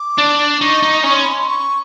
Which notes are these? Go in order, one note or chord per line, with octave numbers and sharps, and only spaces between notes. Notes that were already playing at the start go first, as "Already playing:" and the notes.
Already playing: D6
D4
D#4 C#6
D#4
C#4 C#6
C6
B5
C6
C#6